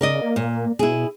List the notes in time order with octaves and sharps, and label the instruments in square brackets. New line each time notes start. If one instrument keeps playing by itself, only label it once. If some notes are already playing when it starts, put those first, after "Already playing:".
[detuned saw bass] C#3 [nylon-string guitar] A#4 D5 D#5
[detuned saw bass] A#3
[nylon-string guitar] A#2
[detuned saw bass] B2 [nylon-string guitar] E4 G#4